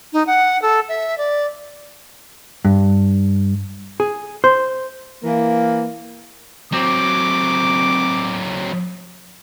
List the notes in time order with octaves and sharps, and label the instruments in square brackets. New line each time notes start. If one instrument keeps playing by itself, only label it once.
[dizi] D#4
F#5
A4
E5
D5
[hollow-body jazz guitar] G2
G#4
C5
[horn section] E3 A#3
[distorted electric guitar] F#3 C4 [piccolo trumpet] D6